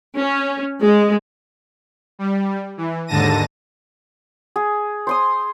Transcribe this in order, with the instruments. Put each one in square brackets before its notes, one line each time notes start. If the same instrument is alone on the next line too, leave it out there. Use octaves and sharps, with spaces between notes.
[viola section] C#4
G#3
[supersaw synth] G3
E3
D#2 G#2 D3 A5 A#6 D#7
[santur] G#4
C5 C6 D#6